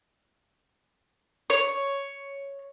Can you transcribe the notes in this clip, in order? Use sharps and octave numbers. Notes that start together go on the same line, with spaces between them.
C#5